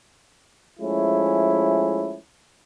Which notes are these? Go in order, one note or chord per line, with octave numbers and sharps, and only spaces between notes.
F3 G#3 A3 C#4 E4